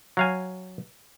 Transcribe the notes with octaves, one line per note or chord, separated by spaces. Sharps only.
F#3 F5 G#5